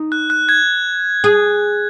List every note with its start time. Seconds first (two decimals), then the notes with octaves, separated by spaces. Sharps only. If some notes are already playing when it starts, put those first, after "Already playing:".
Already playing: D#4
0.12 F#6
0.30 F#6
0.49 G#6
1.24 G#4